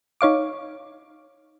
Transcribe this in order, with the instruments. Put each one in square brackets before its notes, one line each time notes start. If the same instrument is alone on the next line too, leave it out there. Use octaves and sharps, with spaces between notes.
[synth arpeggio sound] D#4 C#5 F5 D6